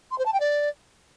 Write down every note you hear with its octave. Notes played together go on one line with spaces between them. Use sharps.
C6
C5
A5
G5
D5